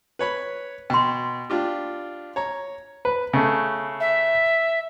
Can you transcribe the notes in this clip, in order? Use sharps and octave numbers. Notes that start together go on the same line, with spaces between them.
B4 C#5 B5
B2 G5 C6
D4 F4 G4
C#5 A#5
B4
C#3 A3
E5